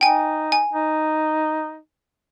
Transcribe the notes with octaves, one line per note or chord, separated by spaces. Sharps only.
D#4 G5 G#5
G#5
D#4